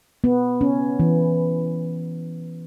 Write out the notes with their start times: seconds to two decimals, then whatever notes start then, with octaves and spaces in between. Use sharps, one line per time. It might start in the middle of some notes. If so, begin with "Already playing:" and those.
0.24 B3
0.61 C#4
1.00 E3